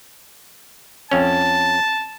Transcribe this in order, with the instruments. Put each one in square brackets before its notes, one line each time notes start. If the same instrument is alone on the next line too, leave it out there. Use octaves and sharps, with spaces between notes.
[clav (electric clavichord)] F2 C#4 [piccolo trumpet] A5